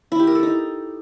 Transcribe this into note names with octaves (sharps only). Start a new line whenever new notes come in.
E4
G4
A#4
A4
D#4